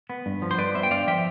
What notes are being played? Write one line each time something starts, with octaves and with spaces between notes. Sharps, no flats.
B3
G2
F3
C5
G2 B4 D5
B3 C5 E5
G5
G2 D5 F5
F3 E5 G5